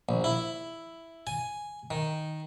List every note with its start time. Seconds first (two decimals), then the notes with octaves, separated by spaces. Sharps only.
0.09 A#1
0.24 E4
1.27 G#5
1.91 D#3